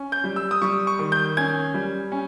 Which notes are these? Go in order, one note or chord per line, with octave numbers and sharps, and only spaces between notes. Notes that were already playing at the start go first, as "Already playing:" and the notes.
Already playing: C#4
G6
G3
E6
D#6
G3 C#6
C#6
D#3
G6
C#4 G#6
G3
C#4